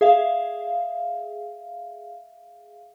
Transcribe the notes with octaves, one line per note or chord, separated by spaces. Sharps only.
G#4 E5 F5